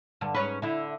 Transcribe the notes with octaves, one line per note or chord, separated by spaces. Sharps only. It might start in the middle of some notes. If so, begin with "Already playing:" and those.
G2 D3
G#2 C#4 B4
D3 E4